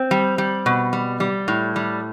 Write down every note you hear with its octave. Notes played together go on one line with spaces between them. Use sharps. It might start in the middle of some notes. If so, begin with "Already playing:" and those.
Already playing: C4
G3
G3
B2
G3
G3
A2
G3